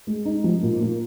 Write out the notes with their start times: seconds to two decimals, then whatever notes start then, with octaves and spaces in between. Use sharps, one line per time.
0.07 G#3
0.25 D#4
0.44 F3
0.63 A#2
0.81 A#2